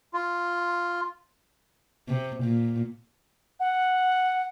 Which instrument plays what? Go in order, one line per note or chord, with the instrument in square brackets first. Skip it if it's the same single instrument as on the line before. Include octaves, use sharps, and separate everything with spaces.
[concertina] F4
[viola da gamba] C3
A#2
[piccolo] F#5